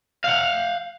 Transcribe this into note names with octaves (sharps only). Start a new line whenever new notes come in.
F5 F#5